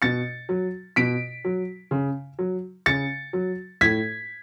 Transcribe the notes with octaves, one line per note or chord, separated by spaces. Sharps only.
B2 A6 C#7
F#3
B2 B6 D7
F#3
C#3
F#3
C#3 A6 C#7
F#3
A2 G#6 B6